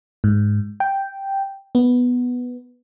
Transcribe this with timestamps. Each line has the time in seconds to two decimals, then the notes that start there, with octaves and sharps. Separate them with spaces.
0.24 G#2
0.80 G5
1.75 B3